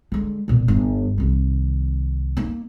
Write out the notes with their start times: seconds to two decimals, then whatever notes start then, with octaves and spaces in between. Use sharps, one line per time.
0.12 D3 G#3
0.48 E1 A#2
0.68 G1 D#4
1.18 C2 D#3
2.37 A#3 D#4